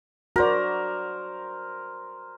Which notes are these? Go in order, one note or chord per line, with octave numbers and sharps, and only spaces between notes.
F#4 A#4 C5 D5